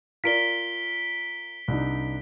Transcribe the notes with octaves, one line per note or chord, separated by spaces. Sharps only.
F4 A#4 D5 B6 D7 G7
C2 D4 D#4